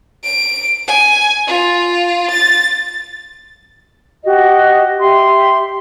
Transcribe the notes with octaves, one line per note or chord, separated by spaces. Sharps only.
D7
G#5
F4
A6
F#4 G4 D#5
G4 E5 C6